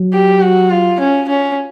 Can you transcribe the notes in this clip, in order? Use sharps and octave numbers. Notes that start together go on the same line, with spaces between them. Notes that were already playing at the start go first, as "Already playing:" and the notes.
Already playing: F#3
G4
F#4
F4
C#4
C#4